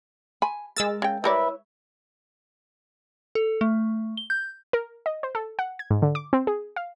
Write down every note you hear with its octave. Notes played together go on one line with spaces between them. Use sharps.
G#5 B5
G#3 A#4 E6 A6
C#3 G5
G3 E4 A#4 B4 C#5 D5 E5
A4
A3
G7
G6
A#4
D#5
C5
A4
F#5
G#6
G#2
D3
D6
C4
G#4
F5